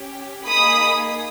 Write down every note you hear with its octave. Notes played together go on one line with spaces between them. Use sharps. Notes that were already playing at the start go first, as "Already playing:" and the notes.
Already playing: C#4 G4
A#3 D#4 G#4 B5 D#6